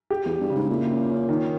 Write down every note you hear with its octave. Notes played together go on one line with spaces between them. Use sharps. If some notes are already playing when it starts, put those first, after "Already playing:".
G4
E2 G4
G2
C#3
G#2
A#2 E4
C#4
C#4
D#3